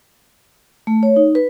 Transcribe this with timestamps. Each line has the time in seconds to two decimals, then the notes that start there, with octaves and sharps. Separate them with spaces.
0.87 A3
1.03 C#5
1.16 D#4
1.35 B4